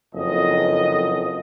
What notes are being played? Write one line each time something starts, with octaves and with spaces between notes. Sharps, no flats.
F#1 F2 D#5